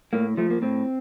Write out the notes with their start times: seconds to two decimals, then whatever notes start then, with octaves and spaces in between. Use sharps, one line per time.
0.13 A2 A#3
0.37 F3 A3
0.50 A#3
0.62 A2 C4